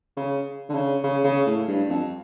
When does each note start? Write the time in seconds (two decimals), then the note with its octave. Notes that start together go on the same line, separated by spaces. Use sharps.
0.17 C#3
0.69 D3
0.74 C#3
1.03 C#3
1.24 C#3
1.46 A2
1.67 G2
1.89 F2